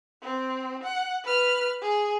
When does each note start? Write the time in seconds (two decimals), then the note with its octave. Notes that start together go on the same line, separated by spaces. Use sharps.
0.22 C4
0.83 F#5
1.24 B4 F6
1.82 G#4